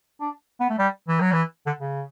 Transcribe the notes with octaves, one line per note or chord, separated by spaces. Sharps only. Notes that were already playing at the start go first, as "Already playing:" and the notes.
D4
B3
A3
G3
E3
F#3
E3
D3
C#3